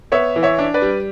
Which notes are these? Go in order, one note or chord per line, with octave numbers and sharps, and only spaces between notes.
B3 C#5 E5
E3
C#5 E5
D4
B4 D5
G3